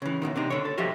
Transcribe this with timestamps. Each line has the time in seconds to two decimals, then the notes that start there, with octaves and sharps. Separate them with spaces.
0.02 C#3 E3
0.22 E2 G2 B2 D#3
0.36 C3 D4 D#4
0.50 D3 C#5
0.65 A4
0.78 F3 F#4 G4 D#5 E5